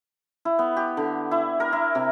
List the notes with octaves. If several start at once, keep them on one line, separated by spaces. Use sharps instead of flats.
E4
B3
G4
D3
E4
A#4
E4
C3